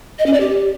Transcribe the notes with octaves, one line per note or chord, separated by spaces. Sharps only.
D#5
C#4
D5
G4